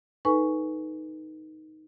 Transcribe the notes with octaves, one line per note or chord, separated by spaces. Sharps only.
D#4 A4 B4 G#5 C#6